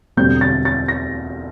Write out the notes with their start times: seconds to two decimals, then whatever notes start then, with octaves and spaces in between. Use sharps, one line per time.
0.17 E1 D2 D3 G3 C4 G6
0.41 A6
0.65 A6
0.88 A#6